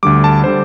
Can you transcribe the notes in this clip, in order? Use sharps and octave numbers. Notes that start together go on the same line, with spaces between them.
D2 D3 G3 D6
A5
D3 G3 C5